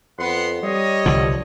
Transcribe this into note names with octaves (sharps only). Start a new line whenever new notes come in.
F2 B3 F#5 C6
G3 C#5 D#5
C2 D3 F3